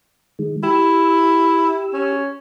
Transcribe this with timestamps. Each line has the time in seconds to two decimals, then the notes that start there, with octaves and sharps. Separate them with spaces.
0.39 D#3 G#3
0.63 E4 G4 E6
1.94 C#4